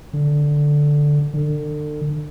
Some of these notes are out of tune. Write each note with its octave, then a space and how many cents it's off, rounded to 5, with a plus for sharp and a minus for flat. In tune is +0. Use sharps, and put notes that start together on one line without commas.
D3 +0
D3 +35